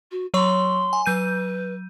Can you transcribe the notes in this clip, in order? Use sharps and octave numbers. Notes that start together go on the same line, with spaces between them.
F#4
F#3 C#5 C6 C#6
G#5
F#3 B4 G6 D#7